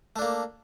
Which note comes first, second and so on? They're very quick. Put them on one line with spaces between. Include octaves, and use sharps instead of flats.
A3 D4 A#3